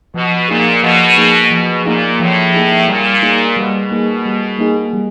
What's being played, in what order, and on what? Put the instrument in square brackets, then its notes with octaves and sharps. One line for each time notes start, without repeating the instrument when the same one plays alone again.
[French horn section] B2 [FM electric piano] F3
[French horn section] A#2 [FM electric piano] A#3 D#4 G#4
[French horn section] B2 [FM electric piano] F3
[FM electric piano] A#3 D#4 G#4
[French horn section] B2 [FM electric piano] F3
[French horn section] A#2 [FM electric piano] A#3 D#4 G#4
[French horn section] A2 [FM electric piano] F3
[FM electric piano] A#3 D#4 G#4
[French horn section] A#2 [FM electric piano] G3
[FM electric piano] A#3 D#4 G#4
[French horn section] B2 [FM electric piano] G3
[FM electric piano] A#3 D#4 G#4
G3
A#3 D#4 G#4
G3